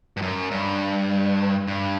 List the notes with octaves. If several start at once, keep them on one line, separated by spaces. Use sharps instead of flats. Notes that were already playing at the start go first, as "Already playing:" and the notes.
G2
F#2
G2
G2